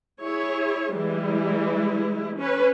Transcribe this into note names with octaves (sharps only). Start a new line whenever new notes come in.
E4 G#4 C#5
E3 G3 G#3 E4
C#4 B4